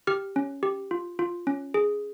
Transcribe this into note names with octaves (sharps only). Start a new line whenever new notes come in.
G4 F6
C#4
G4
F4
F4
C#4
G#4